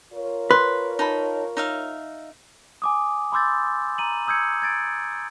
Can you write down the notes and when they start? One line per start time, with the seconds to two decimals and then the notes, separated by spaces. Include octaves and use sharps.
0.13 F4 A#4 C#5
0.51 B4 C6
0.99 D#4 A5 B5
1.57 D#4 E5 F5
2.82 G#5 D6 D#6
3.32 B5 C6 D6 E6 G6 A6
3.98 A#5 D#7 F#7
4.27 D#6 E6 G6 G#6 C#7
4.62 G#6 A6 D7